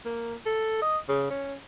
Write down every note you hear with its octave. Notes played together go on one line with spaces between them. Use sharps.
A#3
A4
D#5
C#3
C#4